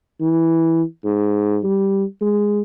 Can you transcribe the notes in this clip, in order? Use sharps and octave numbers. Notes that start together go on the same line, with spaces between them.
E3
G#2
G3
G#3